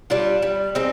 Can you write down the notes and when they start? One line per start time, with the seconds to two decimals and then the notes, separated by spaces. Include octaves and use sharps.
0.10 G3 D4 F4
0.42 G3
0.75 C4 D#4 G#4